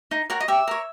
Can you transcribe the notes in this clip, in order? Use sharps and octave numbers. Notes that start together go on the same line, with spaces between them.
D#4
F#4 A#4 C#5
D#5
G4 E5
A#4 C#5